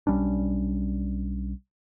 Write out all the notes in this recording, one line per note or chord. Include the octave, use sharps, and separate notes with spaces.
B1 G3 C#4 D4